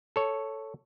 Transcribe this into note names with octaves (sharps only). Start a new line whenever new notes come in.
A4 C#5